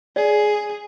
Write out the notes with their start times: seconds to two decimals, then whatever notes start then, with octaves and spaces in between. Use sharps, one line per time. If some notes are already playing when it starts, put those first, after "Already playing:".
0.16 G#4 D5